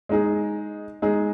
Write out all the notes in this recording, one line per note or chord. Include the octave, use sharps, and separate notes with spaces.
G#3 D#4 G#4
G#3 D#4 G#4